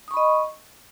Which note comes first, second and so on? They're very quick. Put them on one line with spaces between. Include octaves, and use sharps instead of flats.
D#6 C#6 B5 D#5